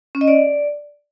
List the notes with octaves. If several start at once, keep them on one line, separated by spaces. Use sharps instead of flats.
C#4
D#5
D5